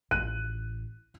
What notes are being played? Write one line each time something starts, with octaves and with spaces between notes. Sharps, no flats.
A1 F#6 D#7